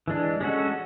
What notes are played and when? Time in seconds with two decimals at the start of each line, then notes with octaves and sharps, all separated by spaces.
0.08 E3 G#3 D4
0.41 G#3 C#4 F#4 A4